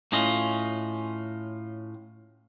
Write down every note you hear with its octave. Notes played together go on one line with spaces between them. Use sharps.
A2 C#4 F4 D#5